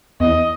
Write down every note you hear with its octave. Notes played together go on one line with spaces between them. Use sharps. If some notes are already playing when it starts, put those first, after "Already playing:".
E2 D#5